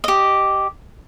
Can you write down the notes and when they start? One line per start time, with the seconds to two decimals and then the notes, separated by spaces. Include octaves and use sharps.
0.04 G4 D#5